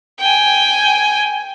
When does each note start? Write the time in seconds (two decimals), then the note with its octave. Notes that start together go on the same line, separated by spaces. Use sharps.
0.20 G5 G#5